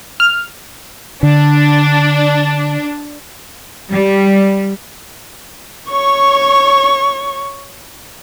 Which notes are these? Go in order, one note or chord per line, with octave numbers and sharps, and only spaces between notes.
F6
D3 D4
G3
C#5 C#6